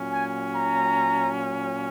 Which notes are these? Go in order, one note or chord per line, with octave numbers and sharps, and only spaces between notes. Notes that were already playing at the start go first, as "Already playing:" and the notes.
Already playing: A#2 F#3 C#4
G#5
A#5